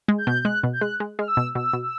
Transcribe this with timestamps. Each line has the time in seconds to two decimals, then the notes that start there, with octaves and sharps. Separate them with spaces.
0.08 G#3
0.18 G6
0.27 B2
0.42 G6
0.45 G#3 F#6
0.63 B2
0.73 G6
0.81 G#3 F#6
1.00 G#3
1.19 G#3 F6
1.28 E6
1.37 B2
1.55 B2 E6
1.73 B2
1.83 E6